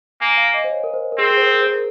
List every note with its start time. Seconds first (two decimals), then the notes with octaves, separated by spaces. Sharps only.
0.21 A#3 G#5
0.37 F5
0.54 D#5
0.64 C5
0.70 C#5
0.84 A#4
0.94 C5
1.12 A#4
1.18 C4 G#4
1.31 G#4
1.37 C5
1.42 A#4
1.54 G#4
1.61 C5
1.67 A#4